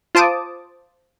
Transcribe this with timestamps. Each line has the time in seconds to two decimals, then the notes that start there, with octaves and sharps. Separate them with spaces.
0.15 F4 C5 A5 D6 D#6